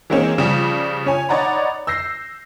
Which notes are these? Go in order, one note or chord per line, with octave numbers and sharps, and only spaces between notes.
E3 G#3 A#3 C4 C#4
C#3 F3 G3
C#4 C#5 G#5
D#4 C#5 D5 F#5 A#5 B5
E6 G6 A#6 C7